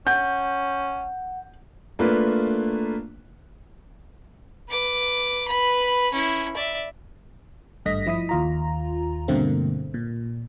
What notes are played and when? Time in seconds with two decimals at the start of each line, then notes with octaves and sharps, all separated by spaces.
0.07 C#4 F#5 G6
1.99 A3 A#3 D4 F4 B4
4.69 B4 D6
5.48 B4 B5
6.13 C#4 E4
6.56 D5 E5
7.85 G#1 G2 A3 D#5 A#6 B6
8.06 F3 E4 D#6 B6
8.29 D#2 F4 A#5
9.28 G2 B2 D3 A3 A#3 C4
9.94 A#2